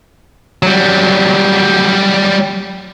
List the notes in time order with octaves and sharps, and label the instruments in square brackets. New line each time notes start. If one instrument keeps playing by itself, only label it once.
[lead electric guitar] F#3 G3